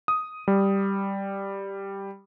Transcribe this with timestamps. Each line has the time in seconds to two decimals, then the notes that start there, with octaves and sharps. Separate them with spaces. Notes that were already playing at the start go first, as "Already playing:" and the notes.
0.08 D#6
0.48 G3